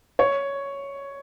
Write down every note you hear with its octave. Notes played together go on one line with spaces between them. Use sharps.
C#5